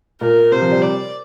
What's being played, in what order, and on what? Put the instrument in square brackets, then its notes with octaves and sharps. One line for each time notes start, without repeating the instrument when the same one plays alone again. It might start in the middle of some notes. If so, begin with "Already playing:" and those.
[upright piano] A#2 [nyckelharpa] A#4
[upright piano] C3 [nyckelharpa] C5
[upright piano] F3
G3
[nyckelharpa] D5